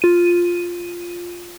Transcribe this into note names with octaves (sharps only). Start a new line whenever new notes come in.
F4 D#7